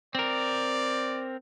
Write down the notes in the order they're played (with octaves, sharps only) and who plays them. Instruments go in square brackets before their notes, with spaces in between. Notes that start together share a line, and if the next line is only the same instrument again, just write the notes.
[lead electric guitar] C4 A#4 [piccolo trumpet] D5